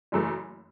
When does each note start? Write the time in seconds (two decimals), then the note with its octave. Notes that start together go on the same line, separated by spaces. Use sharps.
0.12 F#1 F#2 E3 A3